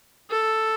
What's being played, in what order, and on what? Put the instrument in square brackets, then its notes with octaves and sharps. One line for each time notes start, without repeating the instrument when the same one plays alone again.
[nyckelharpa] A4